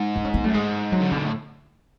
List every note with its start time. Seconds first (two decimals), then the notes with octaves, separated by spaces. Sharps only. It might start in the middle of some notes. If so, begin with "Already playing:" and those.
Already playing: G#2
0.16 D4
0.25 C#4
0.34 B3
0.44 F#2 A3
0.54 G#2 G#3
0.92 F#3
1.00 D3
1.08 C#3
1.12 B2 D3
1.24 A2